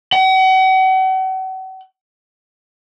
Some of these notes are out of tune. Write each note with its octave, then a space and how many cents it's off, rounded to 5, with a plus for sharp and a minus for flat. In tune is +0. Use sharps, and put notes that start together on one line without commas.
F#5 +40